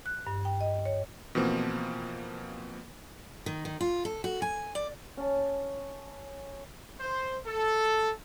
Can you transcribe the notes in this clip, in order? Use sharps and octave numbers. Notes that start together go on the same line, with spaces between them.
F#6
G2
G5
D#5
C#5
B2 E3 F3 A#3 C4
D#3
D#3
F4
A4
F#4
G#5
D5
C#4 A5
C5
A4